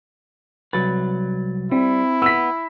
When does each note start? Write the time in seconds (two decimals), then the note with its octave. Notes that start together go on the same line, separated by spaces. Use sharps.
0.73 C2 F#3 B4 A6
1.72 G3 C4 E4
2.22 B3 E6 B6